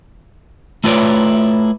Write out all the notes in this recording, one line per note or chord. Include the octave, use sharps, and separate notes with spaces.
A3 E4 F4 B4 C#5 D5